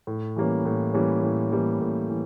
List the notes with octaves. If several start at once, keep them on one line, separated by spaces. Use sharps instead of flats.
A2
E3 G3 A#3 C#4
A2
E3 G3 A#3 C#4
A2
E3 G3 A#3 C#4
A2
E3